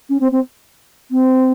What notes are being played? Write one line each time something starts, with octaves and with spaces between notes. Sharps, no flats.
C#4
C4
C4
C4